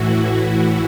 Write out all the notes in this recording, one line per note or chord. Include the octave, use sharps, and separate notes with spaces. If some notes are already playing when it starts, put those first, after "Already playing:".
Already playing: A2 E3 E4 F#4